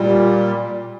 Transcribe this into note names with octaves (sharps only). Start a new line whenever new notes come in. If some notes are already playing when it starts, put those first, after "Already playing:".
Already playing: A#2 G3